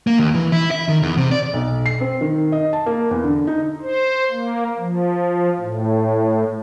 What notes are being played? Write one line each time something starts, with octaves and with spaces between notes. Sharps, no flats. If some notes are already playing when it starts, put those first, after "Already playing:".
A#3
D#2
E3
E4
E5
D#3
E2
C3
D5
B1
C7
C4
D#3
D#5
A5
A#3
E2
D3
D#4
C5
A#3
F3
A2